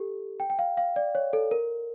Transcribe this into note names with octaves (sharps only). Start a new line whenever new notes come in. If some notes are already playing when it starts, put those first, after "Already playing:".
Already playing: G4 A4
G5
G5
F5
F5
D5
C#5
A4
A#4